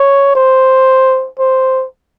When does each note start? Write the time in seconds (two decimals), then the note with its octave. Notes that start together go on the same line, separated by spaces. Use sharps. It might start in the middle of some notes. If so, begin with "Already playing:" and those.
Already playing: C#5
0.35 C5
1.39 C5